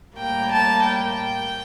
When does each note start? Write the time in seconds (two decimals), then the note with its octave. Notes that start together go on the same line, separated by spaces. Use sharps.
0.16 A2 G3 A#3 G5
0.51 A5
0.84 G5